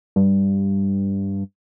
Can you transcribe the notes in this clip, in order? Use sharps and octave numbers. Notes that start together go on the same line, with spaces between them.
G2